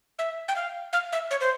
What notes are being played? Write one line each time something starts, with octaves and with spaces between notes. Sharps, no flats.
E5
G5
F5
F5
E5
C#5
C5